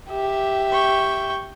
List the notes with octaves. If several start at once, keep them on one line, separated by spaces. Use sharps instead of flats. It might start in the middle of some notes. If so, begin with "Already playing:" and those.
G4 E5
G5 C#6